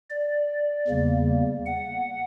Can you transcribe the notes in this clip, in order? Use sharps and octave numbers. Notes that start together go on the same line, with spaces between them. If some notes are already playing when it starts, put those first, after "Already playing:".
D5
E2 C#3 G3 A#3
F#5